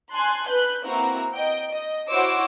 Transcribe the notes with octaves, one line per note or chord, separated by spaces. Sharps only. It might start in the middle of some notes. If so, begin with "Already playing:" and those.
G#5 A5 C6 F#6
B4 F#6 G6
A#3 C4 E4 F#4 A#5
D#5 G5
D#5
E4 F#4 C5 C#5 D6 E6